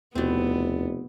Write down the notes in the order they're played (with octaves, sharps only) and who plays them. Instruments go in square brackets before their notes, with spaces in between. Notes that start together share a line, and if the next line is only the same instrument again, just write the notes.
[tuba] F1 [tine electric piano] D#2 E4 A6 [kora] B2 C4 [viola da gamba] B3